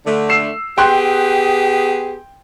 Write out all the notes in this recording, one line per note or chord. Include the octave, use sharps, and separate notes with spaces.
D3 A3
E6 C7 E7
B3 G4 G#4 G5 C6 F#6